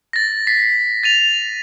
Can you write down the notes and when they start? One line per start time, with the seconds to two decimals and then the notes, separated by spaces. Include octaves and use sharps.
0.13 A6 A#6
0.47 A6 B6 C7
1.03 A6 D#7 F7